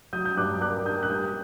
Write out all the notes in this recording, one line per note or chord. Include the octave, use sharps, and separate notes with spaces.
F#3 D#6 G6
G6
G2 D6 F#6
A#3 D6 F#6
D4 D#6 G6
F#6
G3 D#6 G6